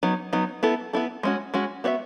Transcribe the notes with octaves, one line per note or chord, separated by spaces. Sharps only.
F#3 B3 D#4
F#3 B3 D#4
B3 E4 A4
B3 E4 A4
G#3 C#4 F#4
G#3 C#4 F#4
B3 F#4 C#5 E5